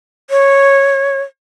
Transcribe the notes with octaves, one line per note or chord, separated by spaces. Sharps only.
C#5